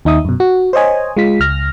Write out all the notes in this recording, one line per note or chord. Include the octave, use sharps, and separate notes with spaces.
D#2 D#4 E5 D#6
F#2 B2
F#4
C5 C#5 D#5 G#5
G#3 F4 B6
C#2 F6 A#6